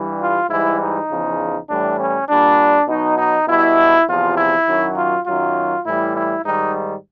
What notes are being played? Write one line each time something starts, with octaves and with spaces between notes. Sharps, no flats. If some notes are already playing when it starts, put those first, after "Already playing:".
Already playing: G2 E3 G3
F4
G#2 E3 G3 E4
D#4
E2 C#3 F3
A2 E3 G3 D4
C#4
A#2 G3 D4
B2 F#3 D#4
D#4
B2 G3 E4
E2 C3 F3 F4
E4
F#2 D#3 F#3
F4
F#2 D#3 F#3 F4
A2 E3 G3 E4
E4
G#2 D#3 G3 D#4